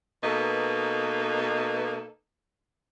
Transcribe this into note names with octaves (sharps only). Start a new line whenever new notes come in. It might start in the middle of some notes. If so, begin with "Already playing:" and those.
B2 A#3 D#4 A4 B4